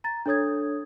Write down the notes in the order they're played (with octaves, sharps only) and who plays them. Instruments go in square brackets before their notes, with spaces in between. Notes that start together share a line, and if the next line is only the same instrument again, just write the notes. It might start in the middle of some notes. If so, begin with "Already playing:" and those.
[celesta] A#5 A6
D4 A4 C#5 D#6 G#6